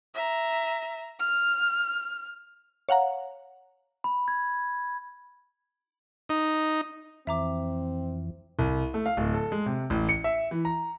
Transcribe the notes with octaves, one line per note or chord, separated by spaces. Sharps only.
E5 A#5
F6
C#5 F5 F#5 A#5
B5
G#6
D#4
F2 E3 C4 E5 A#5 D6
C2
A3
F5
D1
A4
G#3
C3
A1
C#7
E5
E3
A#5